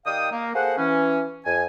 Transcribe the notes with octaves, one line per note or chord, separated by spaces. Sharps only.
D#3 G4 D5 F5 G5 D#6
A#3
A#3 G#4 A4 C5 F#5
E3 C#4
F2 G#5